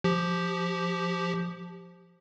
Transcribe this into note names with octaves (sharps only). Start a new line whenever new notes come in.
F3 G4